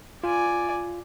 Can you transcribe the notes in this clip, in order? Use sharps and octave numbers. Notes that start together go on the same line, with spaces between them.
F4 D5 G#5